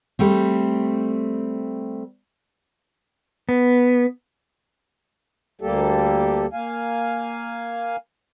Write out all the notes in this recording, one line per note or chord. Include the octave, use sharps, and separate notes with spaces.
G3 A3 C4
B3
D2 G3 A#3 G4 A4
A#3 F5 G#5